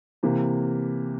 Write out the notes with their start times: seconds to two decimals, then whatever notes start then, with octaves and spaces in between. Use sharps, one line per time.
0.23 C3 E3 A#3